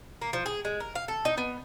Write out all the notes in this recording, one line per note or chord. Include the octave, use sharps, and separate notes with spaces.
A#3
F3
G#4
G#3
A#4
F5
A4
D#4
B3